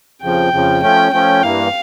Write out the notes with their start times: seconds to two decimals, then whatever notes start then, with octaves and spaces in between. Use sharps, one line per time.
0.22 F2 C#3 F3 G5
0.53 F2 C#3 F3
0.82 F3 A3 C#4 G5
1.12 F3 A3 C#4 G5
1.42 G2 E3 A#3 F5